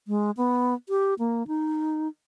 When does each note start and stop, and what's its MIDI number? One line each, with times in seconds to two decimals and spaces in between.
0.08 0.31 56
0.37 0.74 59
0.89 1.14 67
1.19 1.46 58
1.47 2.08 63